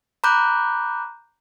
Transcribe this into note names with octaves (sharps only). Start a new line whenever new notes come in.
A#5 B5 D6 F#6 G6